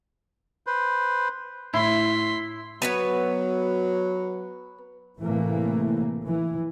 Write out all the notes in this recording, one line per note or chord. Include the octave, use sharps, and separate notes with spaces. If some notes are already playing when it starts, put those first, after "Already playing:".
B4 C5
A2 E4 C6 B6
F#3 B3 B4 C#5
A2 C3 E3 A3 A#3
E3